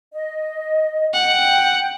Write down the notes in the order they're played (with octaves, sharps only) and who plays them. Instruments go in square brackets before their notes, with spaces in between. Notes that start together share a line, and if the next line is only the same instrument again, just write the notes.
[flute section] D#5
[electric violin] F#5 [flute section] G5